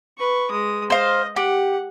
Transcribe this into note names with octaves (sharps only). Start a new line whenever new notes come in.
B4 C#6
G#3 D#6
C5 D#5 F5
G4 F#5